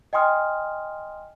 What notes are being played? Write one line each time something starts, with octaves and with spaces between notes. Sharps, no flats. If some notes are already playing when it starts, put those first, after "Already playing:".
D#5 G5 G#5 C6 D#6 F6